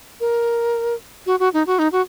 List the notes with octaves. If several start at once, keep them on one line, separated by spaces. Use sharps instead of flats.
A#4
F#4
F#4
D#4
F#4
D#4
F#4